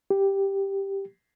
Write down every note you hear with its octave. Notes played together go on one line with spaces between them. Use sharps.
G4